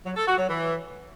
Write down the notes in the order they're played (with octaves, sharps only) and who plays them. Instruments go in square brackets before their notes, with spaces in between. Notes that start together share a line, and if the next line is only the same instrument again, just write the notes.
[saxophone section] F#3
A4
F#4
F#3
E3